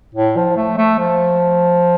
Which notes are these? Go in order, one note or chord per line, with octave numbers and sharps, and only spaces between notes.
A2
F3
A3
A3
F3